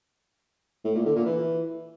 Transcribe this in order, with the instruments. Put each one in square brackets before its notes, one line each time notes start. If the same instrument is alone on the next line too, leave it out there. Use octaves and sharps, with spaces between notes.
[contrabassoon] A2
A#2
D3
A#2
E3